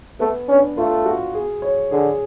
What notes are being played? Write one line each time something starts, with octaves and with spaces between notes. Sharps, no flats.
A3 B3
C#4 D4
A3 F4
F#4
G#4
C#5
D3 G#4